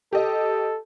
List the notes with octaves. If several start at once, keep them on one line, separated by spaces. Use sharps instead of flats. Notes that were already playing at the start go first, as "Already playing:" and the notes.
G4 A4 D#5